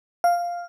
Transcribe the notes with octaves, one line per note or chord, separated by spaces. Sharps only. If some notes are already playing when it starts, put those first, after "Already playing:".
F5